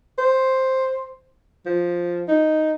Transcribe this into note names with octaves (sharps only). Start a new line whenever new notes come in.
C5
F3
D#4